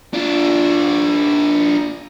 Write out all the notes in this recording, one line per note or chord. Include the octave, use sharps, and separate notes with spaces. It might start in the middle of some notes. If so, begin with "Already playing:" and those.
D4 F4